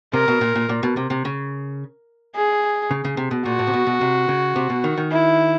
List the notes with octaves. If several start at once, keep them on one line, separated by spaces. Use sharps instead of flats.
C3 A#4
B2
A#2
A#2
A#2
B2
C3
C3
C#3
G#4
C#3
C#3
C3
B2
A#2 F#4
A2
C3
B2
B2
C3
C#3
C3
B2
D#3
D#3
E4